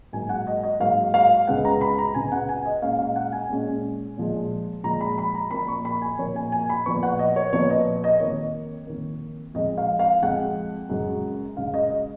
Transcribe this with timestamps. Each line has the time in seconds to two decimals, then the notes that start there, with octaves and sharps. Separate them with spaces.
0.13 G#2 F#3 A#3 G#5
0.29 F#5
0.47 D#5
0.63 D#5
0.80 G#2 F#3 A#3 F5
1.14 F5
1.47 C#2 C#3 G#3 B3 F#5
1.65 A#5
1.81 B5
1.98 A#5
2.14 C#2 C#3 G#3 B3 G#5
2.32 F#5
2.49 G#5
2.66 D#5
2.82 A#2 G#3 C#4 F5
2.99 F5
3.16 F#5
3.32 G#5
3.49 A#2 G#3 C#4
4.17 A#2 F3 G#3
4.83 A#2 F3 G#3 A#5
5.01 B5
5.18 B5
5.35 A#5
5.51 A#2 F3 A#3 B5
5.68 C#6
5.85 B5
6.02 G#5
6.19 A#2 F3 A#3 C#5
6.36 G#5
6.52 G#5
6.69 B5
6.86 A#2 F3 B3 C#6
7.03 F#5
7.19 D#5
7.36 C#5
7.52 A#2 F3 B3 C#5
7.70 D#5
8.04 D#5
8.20 F2 D#3 A#3 C#5
8.87 F2 D#3 A#3
9.54 F2 F3 G#3 D#5
9.78 F5
9.99 F5
10.22 F2 F3 G#3 F#5
10.89 F#2 C#3 G#3
11.57 F#2 C#3 G#3 F5
11.74 D#5
11.90 D#5